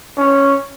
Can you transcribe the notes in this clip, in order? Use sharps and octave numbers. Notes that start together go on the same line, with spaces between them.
C#4